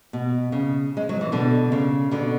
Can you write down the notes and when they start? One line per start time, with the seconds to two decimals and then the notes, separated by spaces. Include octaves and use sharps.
0.13 B2
0.52 C#3
0.97 G#3
1.09 F#3
1.21 E3
1.32 B2 D3
1.72 C#3
2.11 B2 D3